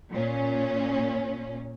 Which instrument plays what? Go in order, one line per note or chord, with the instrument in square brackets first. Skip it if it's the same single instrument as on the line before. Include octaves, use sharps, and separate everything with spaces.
[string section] A#2 C#4